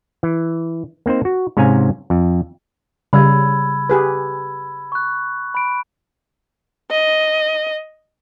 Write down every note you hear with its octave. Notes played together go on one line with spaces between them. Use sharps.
E3
A#3 C4 D#4 C5
F#4
G#2 C3 C#4 F5 G#5 A#5
F2
C#3 G3 B5 E6 G#6
G4 G#4 B4
C#6 F#6
B5 D7
D#5